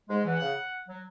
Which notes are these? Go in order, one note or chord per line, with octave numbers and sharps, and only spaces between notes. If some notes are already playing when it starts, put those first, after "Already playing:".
G#2 G#3
E2 E3 F#5
C#3
F#3